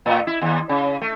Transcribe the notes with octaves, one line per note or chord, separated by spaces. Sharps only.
A2
E4
D#2
C#3
A3